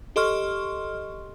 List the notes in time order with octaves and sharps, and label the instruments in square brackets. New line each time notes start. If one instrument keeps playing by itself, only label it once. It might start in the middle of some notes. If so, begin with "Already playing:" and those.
[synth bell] G4 A4 D#5 C6 C#6 F6